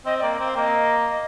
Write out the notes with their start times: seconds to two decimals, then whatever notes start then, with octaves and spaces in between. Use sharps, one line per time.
0.05 C4 D#5
0.18 D5
0.23 A#3
0.39 C4 F5
0.56 A#3 D#5